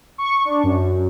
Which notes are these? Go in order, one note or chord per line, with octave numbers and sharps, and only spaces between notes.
C#6
D4
F#2